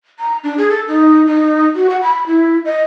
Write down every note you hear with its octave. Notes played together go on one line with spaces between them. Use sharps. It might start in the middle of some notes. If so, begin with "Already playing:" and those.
A#5
D4
G#4
A4
D#4
D#4
F#4
F#5
B5
E4
D#5